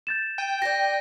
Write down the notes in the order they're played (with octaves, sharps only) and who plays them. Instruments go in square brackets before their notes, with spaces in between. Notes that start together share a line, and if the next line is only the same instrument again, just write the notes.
[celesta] G6 A6 E7
[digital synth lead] G5 [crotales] D#7
[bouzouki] G4 D5 [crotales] A#6